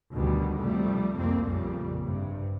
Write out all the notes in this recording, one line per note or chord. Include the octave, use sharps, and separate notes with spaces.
D2 B2 D#3 G3
C3 F3 G3 A3
C2 F2 A#3 C4
A#1 F2 A#2 C#3 G3
G2 C3